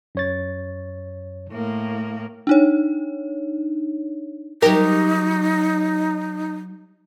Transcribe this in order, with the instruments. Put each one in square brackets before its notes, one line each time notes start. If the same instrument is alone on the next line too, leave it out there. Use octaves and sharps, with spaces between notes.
[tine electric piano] F#2 C#5 A6
[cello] A2 A#3
[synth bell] D4 D#4 C#5
[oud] F#3 G4 [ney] D#4 [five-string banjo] A#4